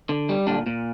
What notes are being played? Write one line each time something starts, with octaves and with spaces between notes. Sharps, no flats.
D3
G3
A#2 D3 D4
A#2